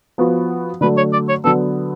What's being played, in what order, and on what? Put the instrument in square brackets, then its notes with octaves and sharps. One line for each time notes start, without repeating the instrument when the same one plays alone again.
[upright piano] F3 B3 F#4
[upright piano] D3 F#3 A3 [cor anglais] B4
[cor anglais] C#5
D5
C#5
[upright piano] D3 F#3 B3 [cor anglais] A4